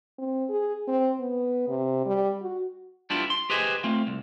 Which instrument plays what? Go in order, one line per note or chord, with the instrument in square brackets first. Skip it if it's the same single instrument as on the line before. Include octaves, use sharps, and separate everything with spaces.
[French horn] C4
G#4
C4
B3
C3
G3
F#4
[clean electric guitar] G3 B3 D4 E4 F4
C6
G4 G#4 B4 C5 D#5 G#5
A3 C4 F4
C2